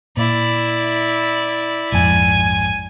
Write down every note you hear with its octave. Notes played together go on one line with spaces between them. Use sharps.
A#2 E4 D5
A#1 F2 G#2 G#5